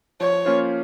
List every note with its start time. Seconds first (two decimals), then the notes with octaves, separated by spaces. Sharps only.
0.20 F3 C#5
0.45 A#3 C#4 F4 C5